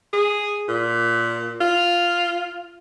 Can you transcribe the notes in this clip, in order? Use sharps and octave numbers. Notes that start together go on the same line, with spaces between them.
G#4
A#2
F4